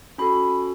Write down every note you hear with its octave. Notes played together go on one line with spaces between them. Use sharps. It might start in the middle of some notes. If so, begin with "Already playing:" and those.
C#4 F#4 A4 B5